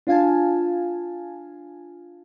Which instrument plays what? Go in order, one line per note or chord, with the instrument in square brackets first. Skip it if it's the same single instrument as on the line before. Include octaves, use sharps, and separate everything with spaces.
[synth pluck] D4 F4 F5 G#5 A5